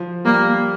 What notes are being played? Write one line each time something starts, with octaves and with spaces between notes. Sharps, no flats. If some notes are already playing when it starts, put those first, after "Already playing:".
Already playing: F3
G3 A#3